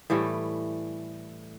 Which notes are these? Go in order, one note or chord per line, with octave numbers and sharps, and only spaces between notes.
A2 E3 G3 A3